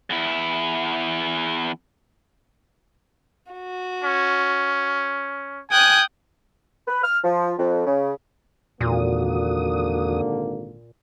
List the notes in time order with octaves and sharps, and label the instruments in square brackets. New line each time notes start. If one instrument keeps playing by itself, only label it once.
[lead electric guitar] E2 E4
[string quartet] F#4
[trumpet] C#4
[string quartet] G5 D#6 F#6 [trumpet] G#5
[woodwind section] B4
F6
F3
F2
C#3
[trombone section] G#1 D3 A#3 [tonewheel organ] E2 F#4 D#6 [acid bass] A#2